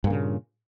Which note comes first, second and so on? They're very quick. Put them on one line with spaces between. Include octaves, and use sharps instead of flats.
G2 A#3 C#3 A#2